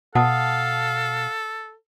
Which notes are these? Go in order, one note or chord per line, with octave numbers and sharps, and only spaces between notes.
B2 A4 F5 F#5 A5 D#6